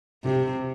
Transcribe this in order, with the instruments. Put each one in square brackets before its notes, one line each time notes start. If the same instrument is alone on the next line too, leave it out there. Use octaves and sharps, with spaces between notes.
[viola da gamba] C3 [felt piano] G4